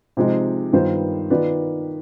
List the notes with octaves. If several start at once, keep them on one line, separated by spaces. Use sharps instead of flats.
C3 F3 G#3 C4 D#4
G2 D#3 B3 F4 C5
D#3 B3 F4 B4 D5